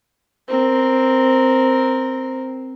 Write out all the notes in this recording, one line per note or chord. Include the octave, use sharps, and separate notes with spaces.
C4 A#4